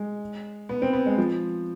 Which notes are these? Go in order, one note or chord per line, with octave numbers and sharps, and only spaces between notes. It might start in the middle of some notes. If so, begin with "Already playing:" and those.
Already playing: G#3
B3
C4
B3
G#3
F3